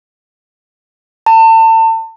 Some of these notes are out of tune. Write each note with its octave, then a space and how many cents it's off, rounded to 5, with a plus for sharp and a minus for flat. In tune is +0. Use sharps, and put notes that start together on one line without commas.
A5 +35